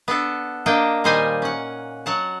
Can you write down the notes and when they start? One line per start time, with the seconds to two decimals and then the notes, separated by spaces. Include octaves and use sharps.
0.08 B3 D4 A4
0.66 A#3 D4 D#5 G5
1.04 A#2 D#3 G3 C5 D#5 G#5
1.42 C#4 F#5
2.06 F#3 F#5 A5